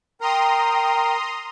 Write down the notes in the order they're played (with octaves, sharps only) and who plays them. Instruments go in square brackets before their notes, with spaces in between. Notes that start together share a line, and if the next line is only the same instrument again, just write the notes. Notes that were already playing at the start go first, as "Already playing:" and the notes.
[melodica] A#4 [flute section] G5 [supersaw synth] A#5 C6 D#6